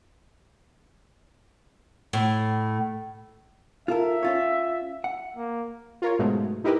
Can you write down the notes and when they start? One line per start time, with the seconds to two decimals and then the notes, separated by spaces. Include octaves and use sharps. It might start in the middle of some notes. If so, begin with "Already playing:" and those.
2.13 A2
3.88 F4 A4 A#4 E5
4.23 C#4 F4 C#5
5.04 F#5
5.37 A#3
6.02 F4 A#4 C#5
6.19 G#2 B2 F#3 G#3 A3
6.64 D#4 E4 G4 A#4 B4